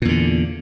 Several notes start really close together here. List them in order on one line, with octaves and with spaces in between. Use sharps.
A#2 E2 D3